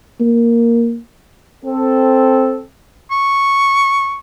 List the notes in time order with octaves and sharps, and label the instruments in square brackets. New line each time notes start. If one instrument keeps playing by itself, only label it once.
[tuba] A#3
[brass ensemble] C4 A4
[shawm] C#6